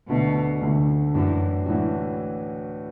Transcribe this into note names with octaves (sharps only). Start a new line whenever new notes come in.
D2 B2 D3 A3 D4
D2 D3 A3 D4
F#2 A2 E3 D4 F#4
A2 E3 D4 F#4